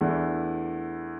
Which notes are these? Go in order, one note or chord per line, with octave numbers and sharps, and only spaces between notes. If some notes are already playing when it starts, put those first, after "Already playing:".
E2 E3 A3 D4